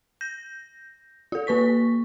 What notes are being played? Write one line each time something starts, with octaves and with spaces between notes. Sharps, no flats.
G6 A#6
F4 A4
A#3 B4 C#6 B6